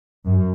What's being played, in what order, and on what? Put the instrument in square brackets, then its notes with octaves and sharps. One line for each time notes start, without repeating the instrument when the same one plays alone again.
[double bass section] F#2